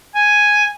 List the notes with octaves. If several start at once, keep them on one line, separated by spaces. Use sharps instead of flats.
G#5